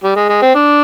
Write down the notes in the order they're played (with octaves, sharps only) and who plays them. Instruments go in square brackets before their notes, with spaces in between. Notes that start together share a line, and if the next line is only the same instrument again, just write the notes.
[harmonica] G3
G#3
G#3
C4
D4